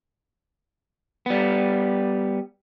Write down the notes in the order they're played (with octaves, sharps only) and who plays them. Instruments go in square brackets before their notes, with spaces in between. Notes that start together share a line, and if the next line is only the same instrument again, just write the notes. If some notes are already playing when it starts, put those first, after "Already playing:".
[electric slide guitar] G3 B3